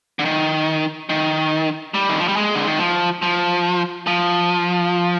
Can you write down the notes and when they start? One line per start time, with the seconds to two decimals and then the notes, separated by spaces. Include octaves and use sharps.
0.19 D3
0.25 D#3
1.09 D#3
1.94 G3
2.09 D#3
2.19 F3
2.28 G3
2.37 G#3
2.55 D3
2.67 D#3
2.79 F3
3.22 F3
4.07 F3